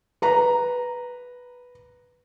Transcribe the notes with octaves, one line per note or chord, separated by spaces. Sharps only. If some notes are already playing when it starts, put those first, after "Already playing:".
B4 A#5